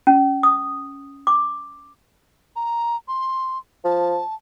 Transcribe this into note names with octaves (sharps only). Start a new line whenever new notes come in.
C#4
D#6
D6
A#5
C6
F3 A5